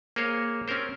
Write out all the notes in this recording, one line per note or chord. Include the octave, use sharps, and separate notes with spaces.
A#3 G#4 A#4 C5 C#5 F5
C4 C#4 G4 A#4 C5